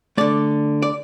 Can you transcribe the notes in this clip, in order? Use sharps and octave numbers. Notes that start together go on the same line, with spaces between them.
D3 A3 D5
D5